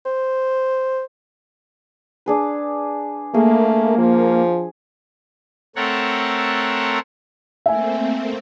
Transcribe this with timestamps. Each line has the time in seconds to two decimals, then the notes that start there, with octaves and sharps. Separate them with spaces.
0.06 C5
2.26 D4 G#4 B4
3.34 A3 A#3 G#4
3.98 F3
5.76 A3 C4 A4 A#4 C#5 F#5
7.66 A3 A#3 C4 E5 G#5